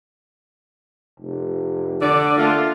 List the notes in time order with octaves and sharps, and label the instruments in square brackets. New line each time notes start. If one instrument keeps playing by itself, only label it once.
[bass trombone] F1
[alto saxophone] D3 [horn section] D5
[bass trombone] A3 [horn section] A#3 F4